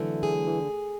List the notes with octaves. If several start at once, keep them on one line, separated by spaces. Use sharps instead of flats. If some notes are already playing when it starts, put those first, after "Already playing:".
Already playing: D3 E3 F#3 A3
G#4
E3